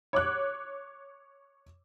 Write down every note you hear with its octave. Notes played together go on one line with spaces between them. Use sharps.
C#5 D6 F#6